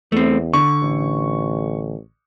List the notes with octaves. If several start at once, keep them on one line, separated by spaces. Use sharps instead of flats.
E2 A3 C4
D3 C#6
A1